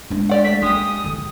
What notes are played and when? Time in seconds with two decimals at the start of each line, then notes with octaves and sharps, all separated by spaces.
0.10 G#3 D4
0.29 G4 D5 F#5
0.44 A3 B6
0.62 G#3 A#3 G4 D#6
1.04 D3